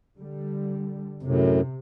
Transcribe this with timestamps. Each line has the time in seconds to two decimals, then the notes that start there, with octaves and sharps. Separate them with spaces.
0.18 D3 G3
1.23 F#2 A2 C3